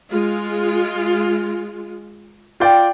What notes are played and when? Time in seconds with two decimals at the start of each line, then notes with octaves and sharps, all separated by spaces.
0.11 G#3 F4
2.60 F4 D5 G5